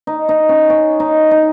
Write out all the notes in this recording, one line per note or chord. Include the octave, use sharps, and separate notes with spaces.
D#4
D#4
C#4
C#4
D#4
D#4